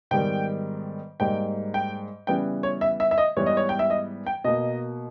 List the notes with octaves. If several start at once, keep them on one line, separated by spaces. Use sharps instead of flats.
G#2 D#3 G3 B3 G5
G#2 G3 A#3 G5
G5
C#3 E3 G3 B3 G5
C#5
E5
E5
E5
D#5
G#2 E3 G3 B3 C#5
D#5
C#5
G5
E5
D#5
G5
B2 A#3 D#5